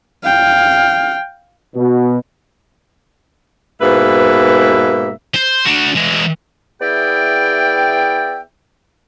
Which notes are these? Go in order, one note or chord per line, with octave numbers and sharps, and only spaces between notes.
F5 G5
B2
G#2 B2 A#3 B4 E5
C5
D4 F#4
E3 G#3
B3 E4 G#4 D5 E5 G5